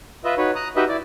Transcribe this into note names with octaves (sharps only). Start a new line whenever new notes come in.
F4 B4 D#5 E5
D#4 F#4 B4 C#5
A#5 D#6 F#6
D#4 F#4 G4 B4 D#5 E5
E4 D5